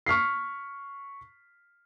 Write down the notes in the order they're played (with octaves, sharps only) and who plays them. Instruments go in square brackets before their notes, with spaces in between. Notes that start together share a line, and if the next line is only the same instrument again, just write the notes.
[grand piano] C#6 F6 B6 C7